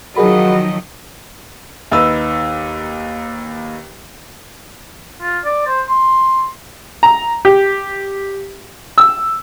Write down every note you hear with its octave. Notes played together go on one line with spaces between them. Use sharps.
D#3 F3 F#3 F#4 G#4 A#4 D#5 B5
D#2 D#4 B4 E6
F4
D5
C5
C6
A#5
G4
E6